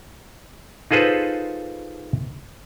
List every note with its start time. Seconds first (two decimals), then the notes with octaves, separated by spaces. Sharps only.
0.91 D#4 F4 G#4 A4 B4 C5